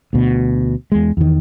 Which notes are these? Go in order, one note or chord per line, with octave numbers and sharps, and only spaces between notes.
D2 B2
E2 G#3
E2 D#3